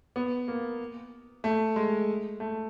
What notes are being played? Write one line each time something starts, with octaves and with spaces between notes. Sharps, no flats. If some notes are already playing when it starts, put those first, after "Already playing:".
B3
A#3
A3
G#3
A3